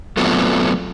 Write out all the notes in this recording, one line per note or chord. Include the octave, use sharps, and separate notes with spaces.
F#3 A3 B3 C4 D4 F4